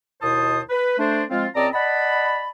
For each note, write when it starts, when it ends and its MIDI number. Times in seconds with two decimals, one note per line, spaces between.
0.22 0.61 39
0.22 0.61 47
0.22 0.61 64
0.22 0.61 72
0.22 0.61 81
0.22 0.61 87
0.70 0.97 71
0.99 1.23 57
0.99 1.23 62
0.99 1.23 72
1.30 1.47 53
1.30 1.47 56
1.30 1.47 60
1.30 1.47 65
1.55 1.68 37
1.55 1.68 60
1.55 1.68 74
1.55 1.68 75
1.55 1.68 81
1.55 1.68 82
1.74 2.49 74
1.74 2.49 75
1.74 2.49 78
1.74 2.49 81
1.74 2.49 83